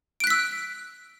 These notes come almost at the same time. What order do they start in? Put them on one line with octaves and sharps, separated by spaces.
D7 F#6 B6 E6